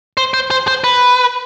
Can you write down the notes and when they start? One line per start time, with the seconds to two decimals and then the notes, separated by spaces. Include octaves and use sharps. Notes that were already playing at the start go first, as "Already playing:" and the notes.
0.17 C5
0.34 C5
0.51 C5
0.68 C5
0.84 B4